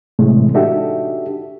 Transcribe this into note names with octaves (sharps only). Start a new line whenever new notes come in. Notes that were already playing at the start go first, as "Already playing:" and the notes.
A2 C3 E3 G#3 A3
D4 D#4 F#4 G4 A4 E5